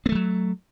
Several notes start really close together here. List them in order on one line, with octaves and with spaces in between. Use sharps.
B3 A3 F3 F#3